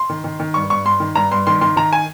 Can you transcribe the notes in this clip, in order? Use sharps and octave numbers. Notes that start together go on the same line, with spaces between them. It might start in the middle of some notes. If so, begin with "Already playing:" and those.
Already playing: C6
D#3
D#3
D#3
G2 C#6
G2 C#6
G2 C6
D#3
G2 A#5
G2 C6
D#3 C6
D#3 C6
D#3 A#5
G#5